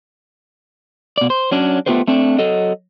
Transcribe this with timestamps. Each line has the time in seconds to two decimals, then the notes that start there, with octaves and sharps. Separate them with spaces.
1.18 B2 D5
1.30 C5
1.52 F#3 C#4 D4
1.86 A3 B3 F4 G4 B4 C5
2.08 A3 C4 D4
2.39 F#3 A4 D#5